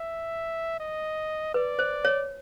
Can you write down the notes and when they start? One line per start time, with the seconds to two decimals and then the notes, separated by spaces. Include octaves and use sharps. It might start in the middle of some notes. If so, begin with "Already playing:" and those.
Already playing: E5
0.80 D#5
1.54 B4 D5
1.79 C5
2.05 C#5